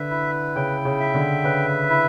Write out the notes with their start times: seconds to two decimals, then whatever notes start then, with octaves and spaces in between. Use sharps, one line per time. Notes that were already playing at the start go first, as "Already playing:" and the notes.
Already playing: D3 B4 E5
0.11 E4
0.56 C#3 G5
0.85 C#3
1.00 E5
1.14 D3
1.44 C#3 B4
1.90 E4